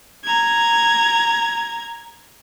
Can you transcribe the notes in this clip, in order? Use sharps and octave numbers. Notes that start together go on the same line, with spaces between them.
A#5 G#6